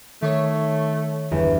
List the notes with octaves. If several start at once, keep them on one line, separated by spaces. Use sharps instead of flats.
D#3 A3 C#5
G1 E2